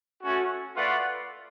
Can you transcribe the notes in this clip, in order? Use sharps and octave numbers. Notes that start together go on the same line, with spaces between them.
A3 C#4 F#4
A3 F4 B4 D5 F#5